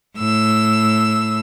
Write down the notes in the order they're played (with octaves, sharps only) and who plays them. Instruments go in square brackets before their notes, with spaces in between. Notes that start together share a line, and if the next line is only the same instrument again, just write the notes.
[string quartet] A2 E6